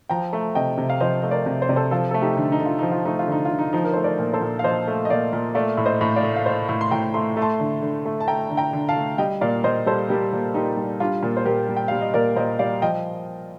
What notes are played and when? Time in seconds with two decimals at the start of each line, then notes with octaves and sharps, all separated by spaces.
0.09 F3 G5 A#5
0.33 A3
0.55 C3 D#5 G5
0.78 C3
0.90 F5
1.00 F3 C5 D#5
1.22 A3 D#5
1.31 A#4 D5
1.46 C3
1.62 C5
1.69 C3 D5
1.76 A4 C5
1.91 F3 F4 A4
2.11 A3 A4
2.21 D#4 G4
2.37 D3
2.52 D#4
2.60 D3
2.66 F4
2.79 F3 D#4
2.92 F4
3.05 A3 D#4
3.19 F4
3.28 D3 D#4
3.45 F4
3.50 D3
3.59 D#4
3.73 F3 D#4
3.85 A#4
3.93 A3 C5
4.04 A#4 D5
4.19 A#2
4.33 A4 C5
4.41 A#2
4.59 F5
4.64 F3 C5 D#5
4.88 A3
5.05 D#5
5.10 A#2 D5 F5
5.33 A#2
5.55 A3 D5 F5
5.77 A2
5.85 C5 D#5
6.01 A2
6.16 D5 F5
6.23 A3
6.36 F5
6.46 A3 C5 D#5
6.69 A2
6.81 C6
6.91 A2 G5 A#5
7.14 A3 C6
7.37 A3
7.42 A5 C6
7.60 D3
7.82 D3
8.05 A3
8.20 A5
8.28 A3 G5 A#5
8.50 D3
8.57 G5 A#5
8.73 D3
8.89 F5 A5
8.96 A3
9.18 G3 D#5 G5
9.41 A#2 D5 F5
9.64 A#2 C5 D#5
9.86 G3 A4 C5
10.09 G3 G4 A#4
10.33 A#2
10.54 A#2 D#4 G4
10.77 G3
11.00 G3 D4 F4
11.23 A#2
11.37 C5
11.45 A#2 G4 A#4
11.68 G3
11.77 G5
11.88 G3 F5
12.01 D#5
12.14 A#2 A#4 D5
12.36 A#2 C5 D#5
12.59 G3 D5 F5
12.82 F3 D#5 G5